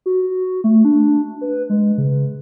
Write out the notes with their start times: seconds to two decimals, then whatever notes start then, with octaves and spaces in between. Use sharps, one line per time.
0.06 F#4
0.64 A3
0.85 D4
1.41 B4
1.70 G#3
1.98 C#3